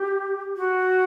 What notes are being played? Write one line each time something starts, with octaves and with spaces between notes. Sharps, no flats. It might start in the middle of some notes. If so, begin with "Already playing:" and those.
Already playing: G4
F#4